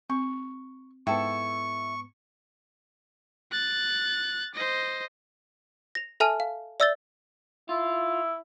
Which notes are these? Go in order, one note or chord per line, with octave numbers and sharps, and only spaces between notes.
C4 C#6
G#2 B3 E4 A4 G5 C#6
F#6 A6
C5 D#5
A#6 F7
A4 E5 G#5 A5 F6 D#7
F5
D5 E5 E6 G6 A6 G7
E4 F4